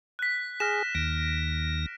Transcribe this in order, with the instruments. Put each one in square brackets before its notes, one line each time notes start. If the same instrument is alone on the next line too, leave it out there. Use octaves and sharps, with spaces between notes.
[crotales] F#6 B6
[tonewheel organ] G#4 [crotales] F6 A#6 E7
[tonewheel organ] D#2 A#6 [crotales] D7